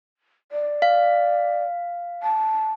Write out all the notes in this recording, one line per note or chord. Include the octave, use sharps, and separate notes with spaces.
D5
F5
A5